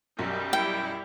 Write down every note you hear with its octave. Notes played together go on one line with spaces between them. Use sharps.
B1 F#2 G3
E4 G5